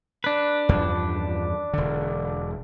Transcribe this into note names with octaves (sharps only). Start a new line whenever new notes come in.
D4 B4
E2 G2 F3
E1 D3